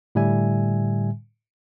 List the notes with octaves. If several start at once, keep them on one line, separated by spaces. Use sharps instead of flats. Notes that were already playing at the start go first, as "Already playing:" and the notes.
A2 D3 G3 E5 G#5